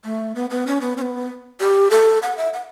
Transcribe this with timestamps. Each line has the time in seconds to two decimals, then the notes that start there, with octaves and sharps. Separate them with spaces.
0.04 A3
0.35 B3
0.50 B3
0.67 C#4
0.81 B3
0.97 C#4
1.02 B3
1.60 G4
1.91 A4
2.23 F#5
2.38 E5
2.53 F#5